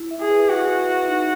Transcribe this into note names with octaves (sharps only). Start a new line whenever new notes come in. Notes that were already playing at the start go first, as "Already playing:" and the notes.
Already playing: E4
E5
G#4
B4
E4 F#4
E4
E5
D#4